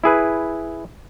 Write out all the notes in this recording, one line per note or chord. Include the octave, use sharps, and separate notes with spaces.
E4 G#4 B4